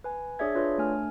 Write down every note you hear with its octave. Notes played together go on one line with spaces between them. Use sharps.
B4 G#5
D4 G#4 C#5 D5 E5 G#6
D4 F4 B4 C#5 D5
A3 D4 G#5 F6